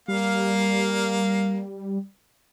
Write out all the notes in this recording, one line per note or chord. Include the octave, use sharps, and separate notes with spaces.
G3 A#3 F5